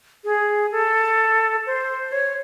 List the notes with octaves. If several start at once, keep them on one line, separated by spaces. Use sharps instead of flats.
G#4
A4
C5
C#5